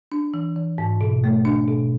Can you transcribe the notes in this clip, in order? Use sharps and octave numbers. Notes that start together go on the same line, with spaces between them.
D4
E3
E3
G#2
B2
A3
D4
B2